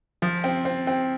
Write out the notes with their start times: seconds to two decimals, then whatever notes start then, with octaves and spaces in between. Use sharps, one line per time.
0.22 F3
0.44 C4
0.65 C4
0.87 C4